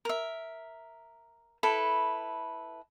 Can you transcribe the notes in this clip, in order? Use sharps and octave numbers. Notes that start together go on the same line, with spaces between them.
A#4 E5
E4 A4 B4